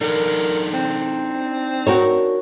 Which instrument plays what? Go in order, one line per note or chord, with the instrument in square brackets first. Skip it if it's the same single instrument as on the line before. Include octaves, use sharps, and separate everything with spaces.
[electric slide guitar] D4 D#4 A4 [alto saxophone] A#4
[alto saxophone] C4
[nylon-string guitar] F#4 A#4 C#5